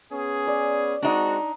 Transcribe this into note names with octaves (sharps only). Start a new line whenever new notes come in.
B3 C#4 G#4
D5
G#3 C4 D4 D#4 F#4